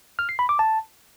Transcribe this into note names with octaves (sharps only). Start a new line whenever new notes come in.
F6
C7
B5
D6
A5